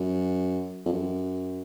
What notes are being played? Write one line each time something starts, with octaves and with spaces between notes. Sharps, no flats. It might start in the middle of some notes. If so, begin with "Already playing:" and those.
Already playing: F#2
F2
F#2